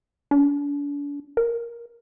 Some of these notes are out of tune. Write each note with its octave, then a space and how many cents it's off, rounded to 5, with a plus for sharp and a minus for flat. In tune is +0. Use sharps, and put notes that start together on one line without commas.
D4 -40
A#4 +10